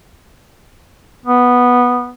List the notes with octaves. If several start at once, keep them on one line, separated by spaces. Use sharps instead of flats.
B3